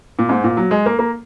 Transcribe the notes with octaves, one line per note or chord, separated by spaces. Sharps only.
A#2
G#2
A#2
F#3
G#3
A#3
A#3